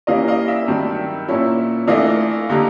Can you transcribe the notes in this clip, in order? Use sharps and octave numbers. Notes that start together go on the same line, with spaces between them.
E3 G3 A#3 C#4 D#5 F5
D#5 F5
D5 E5
G2 D#3 F#3
A#2 F3 A#3 C#4 E4
E3 A3 D4 F4 D#5 F5
D3 G3 A#3 D#4